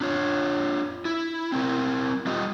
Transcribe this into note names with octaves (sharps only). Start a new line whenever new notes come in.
D4 F4 C#5
E4
C4 E4 A#4
G3 F4 G4 D#5